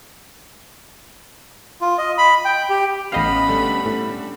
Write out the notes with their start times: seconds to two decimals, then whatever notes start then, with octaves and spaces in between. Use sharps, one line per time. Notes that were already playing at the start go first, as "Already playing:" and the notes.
1.81 F4
1.98 D#5
2.18 B5
2.45 G5
2.70 G4
3.12 A1 B3 C#4 D#5 F5 B5
3.48 D3 G3 A3
3.85 A2